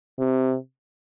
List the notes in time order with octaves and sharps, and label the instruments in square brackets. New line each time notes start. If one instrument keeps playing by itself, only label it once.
[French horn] C3